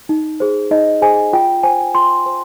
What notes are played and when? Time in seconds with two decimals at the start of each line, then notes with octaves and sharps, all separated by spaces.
0.09 D#4
0.40 G#4 C5
0.71 D#4 D#5
1.02 G#4 C5 G#5
1.33 F4 G5
1.63 C5 G#5
1.94 F4 C6
2.26 C5